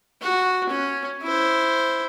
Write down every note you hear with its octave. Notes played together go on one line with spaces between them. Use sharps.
F#4
C#4
E4 C5